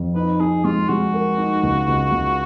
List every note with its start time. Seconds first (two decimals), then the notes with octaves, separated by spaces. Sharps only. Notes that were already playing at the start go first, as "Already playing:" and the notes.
Already playing: F2
0.15 D#4 B4
0.40 D#4 G#4
0.64 G#3 F4
0.89 G#3 F#4
1.14 A#4
1.38 D#4
1.63 C#2
1.87 C#2
2.12 C#2